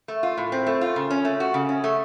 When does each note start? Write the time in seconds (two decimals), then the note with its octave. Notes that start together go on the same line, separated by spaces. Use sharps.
0.08 A3
0.23 F4
0.37 A2
0.52 C4
0.67 A3
0.81 F4
0.96 C#3
1.10 C#4
1.25 A3
1.40 F#4
1.54 C#3
1.69 C#4
1.84 A3